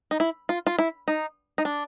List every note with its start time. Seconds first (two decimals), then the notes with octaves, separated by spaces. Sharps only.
0.11 D#4
0.20 E4
0.49 F4
0.67 F4
0.79 E4
1.08 D#4
1.58 D#4
1.65 D4